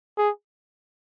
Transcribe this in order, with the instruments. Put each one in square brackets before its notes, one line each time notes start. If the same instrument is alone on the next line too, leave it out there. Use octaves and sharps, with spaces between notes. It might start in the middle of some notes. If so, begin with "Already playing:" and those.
[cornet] G#4